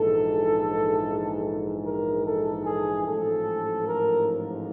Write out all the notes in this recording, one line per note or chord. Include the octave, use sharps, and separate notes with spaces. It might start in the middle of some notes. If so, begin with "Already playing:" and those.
Already playing: A#1 G#2 E3 A4
A#4
A4
G#4
A1 G#2 F3 A4
A#4